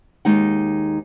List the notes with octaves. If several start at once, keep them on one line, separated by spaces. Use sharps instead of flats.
D#2 G#3 D#4 F#5